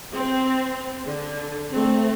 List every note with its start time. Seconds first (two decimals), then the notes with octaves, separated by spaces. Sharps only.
0.14 C4
1.05 D3
1.70 A3 C4